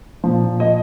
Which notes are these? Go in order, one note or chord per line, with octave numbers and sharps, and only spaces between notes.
A#2 F3
D#5